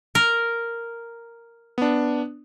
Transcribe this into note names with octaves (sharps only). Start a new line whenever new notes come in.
A#4
B3 D4